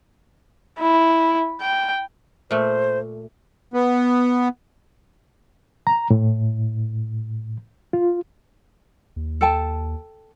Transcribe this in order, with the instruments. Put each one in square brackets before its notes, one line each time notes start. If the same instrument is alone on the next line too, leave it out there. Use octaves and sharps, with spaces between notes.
[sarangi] E4
G5
[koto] A#2 A3 [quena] C5
[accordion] B3
[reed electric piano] A#5
A2
F4
[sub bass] D#2
[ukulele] A4 G5 A5